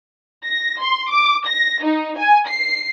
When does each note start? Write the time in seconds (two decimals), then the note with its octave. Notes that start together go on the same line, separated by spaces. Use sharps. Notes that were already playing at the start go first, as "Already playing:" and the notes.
0.45 A#6
0.81 C6
1.11 D6
1.47 A#6
1.84 D#4
2.18 G#5
2.48 C7